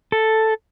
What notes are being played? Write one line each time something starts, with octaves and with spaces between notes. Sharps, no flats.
A4